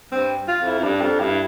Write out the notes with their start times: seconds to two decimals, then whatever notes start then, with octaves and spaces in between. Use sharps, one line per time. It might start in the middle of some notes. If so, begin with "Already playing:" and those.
0.11 G2 C4
0.48 F4
0.60 F2
0.66 E4
0.78 F2
0.83 G2 D4
1.01 F2
1.20 G2 E4